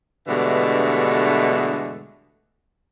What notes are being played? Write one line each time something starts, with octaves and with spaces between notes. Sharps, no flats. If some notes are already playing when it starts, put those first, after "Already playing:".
G2 B2 D3 E3 G#3 A3